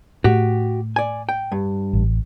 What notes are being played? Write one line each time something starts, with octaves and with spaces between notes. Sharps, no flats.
A2 A3 F#4 G4
D5 G#5
G5
G2
A1